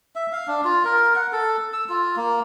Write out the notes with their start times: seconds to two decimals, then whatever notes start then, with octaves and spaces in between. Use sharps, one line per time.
0.16 E5
0.32 F5
0.48 D4
0.64 F4
0.85 A#4
1.16 F#5
1.33 A4
1.73 E6
1.89 F4
2.16 A#3